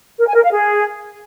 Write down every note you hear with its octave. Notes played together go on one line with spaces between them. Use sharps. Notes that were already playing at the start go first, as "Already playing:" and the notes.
A#4
G#5
A#4
F5
G#4